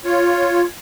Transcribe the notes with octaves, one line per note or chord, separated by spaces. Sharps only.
F4 C#5